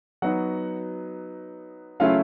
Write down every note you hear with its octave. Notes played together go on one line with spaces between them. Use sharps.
F#3 B3 D#4 F#4 F#5
C#3 F#3 A3 C#4 E4 F4 F5